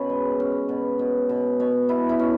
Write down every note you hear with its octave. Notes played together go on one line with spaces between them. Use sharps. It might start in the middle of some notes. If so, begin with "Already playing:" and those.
Already playing: B2 C#4 B4
G#3
C#4
B2
B2
B2
B2 C#5
B2 E4
E4
B2 C#4